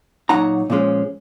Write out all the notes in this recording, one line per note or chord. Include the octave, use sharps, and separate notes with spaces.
A#2 F#3 B3 D#4 F#5 A#5
A#2 F3 G#3 C#4